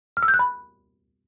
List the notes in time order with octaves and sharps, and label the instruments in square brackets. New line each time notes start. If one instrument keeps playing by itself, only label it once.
[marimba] F6
E6
G6
F#6
B5